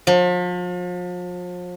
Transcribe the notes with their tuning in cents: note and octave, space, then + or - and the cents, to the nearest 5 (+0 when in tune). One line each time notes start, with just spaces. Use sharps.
F3 +40